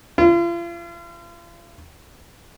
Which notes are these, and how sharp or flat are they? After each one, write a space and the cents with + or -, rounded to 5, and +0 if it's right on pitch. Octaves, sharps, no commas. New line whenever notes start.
F4 -40